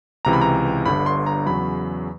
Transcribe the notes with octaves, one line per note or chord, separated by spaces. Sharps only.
C#2 C3 E3 A#5
B5
A#5
G1 G2 D3 B5
C6
A#5
E2 C#3 F#3 B5